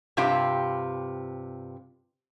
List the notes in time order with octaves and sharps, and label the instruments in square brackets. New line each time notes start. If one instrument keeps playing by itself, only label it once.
[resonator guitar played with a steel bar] G2 C3 C4 F4 G4